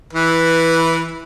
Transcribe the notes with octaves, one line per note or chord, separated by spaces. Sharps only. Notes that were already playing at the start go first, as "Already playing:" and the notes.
E3 B4